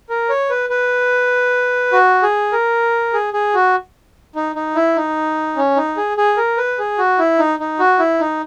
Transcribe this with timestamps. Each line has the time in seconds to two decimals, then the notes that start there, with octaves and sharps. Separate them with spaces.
0.10 A#4
0.29 C#5
0.50 B4
0.70 B4
1.92 F#4
2.23 G#4
2.53 A#4
3.13 G#4
3.33 G#4
3.54 F#4
4.36 D#4
4.55 D#4
4.75 E4
4.96 D#4
5.57 C#4
5.77 D#4
5.97 G#4
6.17 G#4
6.37 A#4
6.58 B4
6.79 G#4
6.98 F#4
7.19 E4
7.39 D#4
7.59 D#4
7.79 F#4
7.99 E4
8.20 D#4